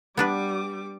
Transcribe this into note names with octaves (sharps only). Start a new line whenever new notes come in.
G3 B3 D4 B4 D6